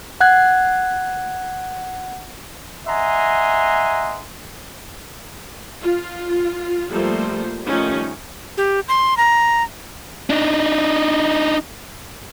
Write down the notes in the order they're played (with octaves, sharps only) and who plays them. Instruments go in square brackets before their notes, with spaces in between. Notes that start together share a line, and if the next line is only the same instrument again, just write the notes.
[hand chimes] F#5 F#6 G#6
[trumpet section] D#5 E5 F#5 G#5 A#5 C6
[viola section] F4
F3 G3 A3 A#3 A4 C5
D#3 F3 G3 A3 C#4 D#4
[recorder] G4
C6
A#5
[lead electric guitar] D4 D#4